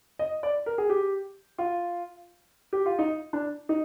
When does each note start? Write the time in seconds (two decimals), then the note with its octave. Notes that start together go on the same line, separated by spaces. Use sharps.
0.19 D#5
0.43 D5
0.66 A#4
0.78 G#4
0.90 G4
1.58 F4
2.73 G4
2.86 F4
2.99 D#4
3.33 D4
3.69 D#4